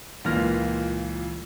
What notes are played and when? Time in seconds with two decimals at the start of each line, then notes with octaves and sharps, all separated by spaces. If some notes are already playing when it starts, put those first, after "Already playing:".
0.24 C#2 A#2 E3 A#3 F6 A#6